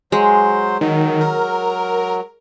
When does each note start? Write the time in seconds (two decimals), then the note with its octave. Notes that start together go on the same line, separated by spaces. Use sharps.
0.12 F#3 G#3 C5
0.81 D#3 F#3
1.21 A#4